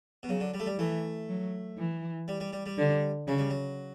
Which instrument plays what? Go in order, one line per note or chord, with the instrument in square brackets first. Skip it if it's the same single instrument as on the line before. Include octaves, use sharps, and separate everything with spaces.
[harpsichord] B2
[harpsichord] C#3 [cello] F#3
[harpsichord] D3
G3
A3
G3
[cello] E3 [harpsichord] A3
[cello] F#3
E3
[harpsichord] G3
G3
G3
G3
[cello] D3
[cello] C#3 [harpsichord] F#3
[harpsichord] G3
F#3